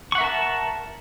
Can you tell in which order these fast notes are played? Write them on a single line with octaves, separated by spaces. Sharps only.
C#6 F#5 E5 A#4 A5